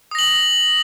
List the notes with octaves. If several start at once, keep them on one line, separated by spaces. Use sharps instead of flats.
D#6 A#6 F#7